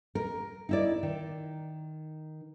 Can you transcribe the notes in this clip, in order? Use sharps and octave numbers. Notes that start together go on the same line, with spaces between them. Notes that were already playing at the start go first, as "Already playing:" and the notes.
A#4
D#4 E4 D5
D#3